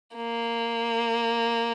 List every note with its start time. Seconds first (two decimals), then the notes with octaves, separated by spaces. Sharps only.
0.16 A#3